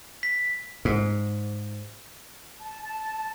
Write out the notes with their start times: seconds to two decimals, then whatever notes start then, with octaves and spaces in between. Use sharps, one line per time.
0.23 B6
0.85 G#2
2.61 A5
2.83 A5